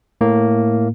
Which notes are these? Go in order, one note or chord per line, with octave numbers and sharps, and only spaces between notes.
A2 A#3